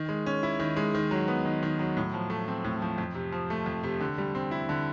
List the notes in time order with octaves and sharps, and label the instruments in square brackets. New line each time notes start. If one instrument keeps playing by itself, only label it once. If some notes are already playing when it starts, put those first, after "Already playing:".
Already playing: [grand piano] D#3
G#3
C#4
E4
D#3
G#3
D#3
F#3
B3
D#3
D#3
F#3
A2
F3
A3
C4
A2
F3
F2
C3
F3
A3
F2
C3
D3
G3
C4
E4
D3